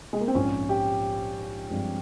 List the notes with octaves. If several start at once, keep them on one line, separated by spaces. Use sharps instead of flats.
G#3
A#3
C4
A#1 G#2 F3 C#4
G4
G2 F3 G#3 C4